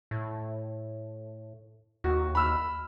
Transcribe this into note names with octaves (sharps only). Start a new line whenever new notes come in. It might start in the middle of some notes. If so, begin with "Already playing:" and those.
A2
D#2 F#4
B5 E6 F6